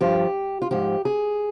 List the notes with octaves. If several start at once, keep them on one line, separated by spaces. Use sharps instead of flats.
G2 F3 G4
F4
G#2 F3 G4
G#4